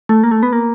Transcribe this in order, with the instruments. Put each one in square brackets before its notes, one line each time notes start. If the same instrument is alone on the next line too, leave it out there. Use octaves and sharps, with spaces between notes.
[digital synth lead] A3
A#3
A3
B3
A#3